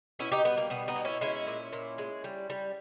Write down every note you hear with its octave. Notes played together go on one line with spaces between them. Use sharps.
B2 C#4 E4
D#4 G4
G3 B3
A#3
B2 B3
B3 D#4
B2
C#4 E4
G#3 C#4 E4
A#2
A#2
G#3
G3
G3